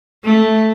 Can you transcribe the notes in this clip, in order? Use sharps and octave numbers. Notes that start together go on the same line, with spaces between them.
A3